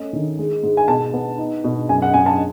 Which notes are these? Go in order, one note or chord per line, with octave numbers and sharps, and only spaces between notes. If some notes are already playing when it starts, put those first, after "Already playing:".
Already playing: A3 C#4 D#5
D#3
G#3
G#2
G#5
B2 A5
B3
D#4
B2
F#2 G#5
F#5
F#2 G#5
A5